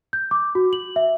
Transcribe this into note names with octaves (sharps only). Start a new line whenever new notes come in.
G6
D6
F#4
F#7
E5